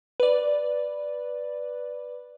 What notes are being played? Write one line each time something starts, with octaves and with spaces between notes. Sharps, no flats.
B4 D5